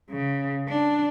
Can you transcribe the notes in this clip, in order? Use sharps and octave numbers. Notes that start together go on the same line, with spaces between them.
C#3
D4